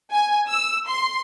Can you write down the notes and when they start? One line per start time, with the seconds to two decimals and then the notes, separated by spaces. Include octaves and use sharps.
0.11 G#5
0.48 E6
0.87 C6